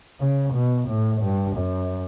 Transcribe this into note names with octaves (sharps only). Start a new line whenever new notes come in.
C#3
B2
A2
G2
F#2